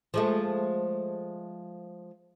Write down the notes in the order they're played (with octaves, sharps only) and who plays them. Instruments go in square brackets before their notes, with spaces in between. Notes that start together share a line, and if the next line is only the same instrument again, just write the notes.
[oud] F3 G#3 A3